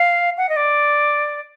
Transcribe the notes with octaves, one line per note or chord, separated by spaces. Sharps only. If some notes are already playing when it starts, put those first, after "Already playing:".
Already playing: F5
F#5
D#5
D5